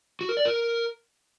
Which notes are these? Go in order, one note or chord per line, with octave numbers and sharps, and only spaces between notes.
F#4
A#4
D5
A#4